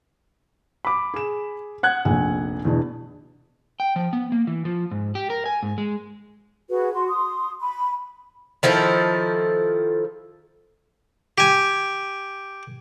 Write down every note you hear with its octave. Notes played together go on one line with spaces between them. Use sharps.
B5 D6
G#4 E7
F#5 F#6 G#6
F1 A#1 G#5
E2 B2 D4
G5
F3
B3
A#3
E3
F3
G#2
G4
A#4
G#5
G#2
G#3
F#4 G#4 B4
F#4 C6
C6 D#6
B5
D#3 F3 E4 A4
G4 G#5